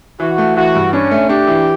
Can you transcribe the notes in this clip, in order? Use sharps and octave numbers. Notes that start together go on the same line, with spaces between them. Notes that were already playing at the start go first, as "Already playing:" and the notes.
E3 F#4
A3
E3 F#4
G2
C#4 D4
A3
D4 G4
E3